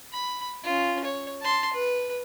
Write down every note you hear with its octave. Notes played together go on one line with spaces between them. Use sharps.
B5
C#4 F4
C#5
A5 C6
B4